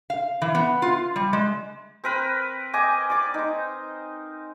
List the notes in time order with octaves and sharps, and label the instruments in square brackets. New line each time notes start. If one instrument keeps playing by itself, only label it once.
[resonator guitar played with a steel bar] F5
E3
B3
F4
G3
G#3
[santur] C4 A#4 B4
D#5 G5 G#5 D6
D5 D6
D#4 C5